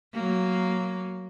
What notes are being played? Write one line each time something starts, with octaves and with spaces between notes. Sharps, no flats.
F#3 A#3